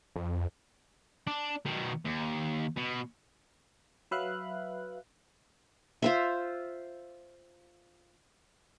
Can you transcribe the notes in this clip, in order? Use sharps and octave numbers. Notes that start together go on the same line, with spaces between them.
F2
D4
B2 D#3
D#2
B2
F#3 B4 E5 F5 F#6
F4 C5 E5